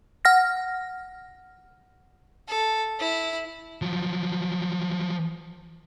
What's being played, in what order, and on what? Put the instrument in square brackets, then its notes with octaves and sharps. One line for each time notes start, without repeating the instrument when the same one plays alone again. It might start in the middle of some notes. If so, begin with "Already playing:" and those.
[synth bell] F#5 F6 A#6
[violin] A4
E4
[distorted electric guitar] F3 F#3